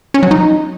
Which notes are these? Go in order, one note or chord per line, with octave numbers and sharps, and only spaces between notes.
C#4
F#3
D#4